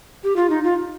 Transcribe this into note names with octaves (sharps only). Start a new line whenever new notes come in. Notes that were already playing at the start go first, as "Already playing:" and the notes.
G4
F4
D#4
F4